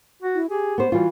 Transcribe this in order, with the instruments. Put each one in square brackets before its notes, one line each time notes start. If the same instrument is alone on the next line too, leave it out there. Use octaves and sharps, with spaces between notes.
[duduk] F#4
[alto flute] E4
[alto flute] G4 [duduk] G#4
[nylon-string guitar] B3 C5
[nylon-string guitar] E3 F4 [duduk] G3 [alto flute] F#4